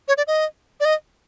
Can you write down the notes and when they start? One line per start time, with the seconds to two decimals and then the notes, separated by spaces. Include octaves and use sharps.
0.08 C#5
0.17 D5
0.27 D#5
0.80 D5
0.85 D#5